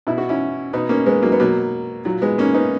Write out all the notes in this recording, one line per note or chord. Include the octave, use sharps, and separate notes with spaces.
B2 E4
F#4
C#4 E4
B2 B3 D#4
A#3 C#4
G#3 B3
F#3 A#3
B3
B2 F#3 A#3
A#2 F#3
G#3 B3
A#3 C#4
B3 D#4